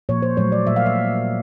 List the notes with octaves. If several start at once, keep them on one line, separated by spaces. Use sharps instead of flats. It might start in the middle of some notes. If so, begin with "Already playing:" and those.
A#2 F3 A#3 C#5
C5
A#2 F#3 A3 C#5
D5
A#2 G3 A#3 E5
F5
E5